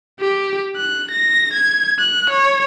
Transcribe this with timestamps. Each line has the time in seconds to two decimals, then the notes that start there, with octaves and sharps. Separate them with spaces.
0.21 G4
0.76 F#6
1.12 A#6
1.54 G#6
2.00 F#6
2.31 C#5